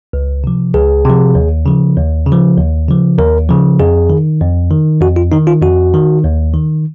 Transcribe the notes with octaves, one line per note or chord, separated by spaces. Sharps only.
C#2
C3 F3
C#2 G#4
C3 F3
D#2
C#3 F3
D#2
C#3
F3
D#2
C#3 F3
D#2 A#4
C#3 F3
F2 G#4
D#3
F2
D#3
F2 F#4
F4
D#3 D#4
F4
F2 F#4
D#3
D#2
D#3